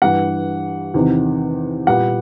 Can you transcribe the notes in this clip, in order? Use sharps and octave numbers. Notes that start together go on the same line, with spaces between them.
G2 E3 G3 F#5
E2 C3 D#3
A#2 G3 B3 F#5